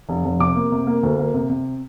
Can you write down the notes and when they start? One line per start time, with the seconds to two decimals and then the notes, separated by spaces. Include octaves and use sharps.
0.09 F1
0.25 F1
0.40 C3 D6
0.55 A#3
0.72 C3
0.87 A#3
1.03 D2
1.19 A#3
1.34 C3
1.50 C3